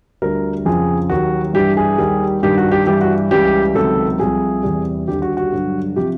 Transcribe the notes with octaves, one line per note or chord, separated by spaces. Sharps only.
D2 D3 G3 A#4
F2 C#3 F3 G#4
D#2 D#3 F#3 F#4
G2 E3 G3 G4
G#4
D#2 D#3 G3
G2 D#3 G3 G4
F#4
G4
G2 E3 G3 G4
F#4
C#2 C#3 E3 G3 G4
C#2 C3 D#3 F#3 A4
C2 C3 F3 G#4
E2 C3 E3 G3
D#2 D3 G3 G4
F#4
F#4
G2 D3 F#3
C3 F3 G4